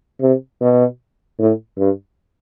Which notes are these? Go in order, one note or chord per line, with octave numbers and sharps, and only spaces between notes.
C3
B2
A2
G2